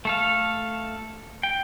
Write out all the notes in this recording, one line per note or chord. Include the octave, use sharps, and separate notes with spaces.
A3 A4 F5
G5